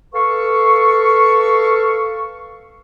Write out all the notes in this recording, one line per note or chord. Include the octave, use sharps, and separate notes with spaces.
A4 B4 F5 C#6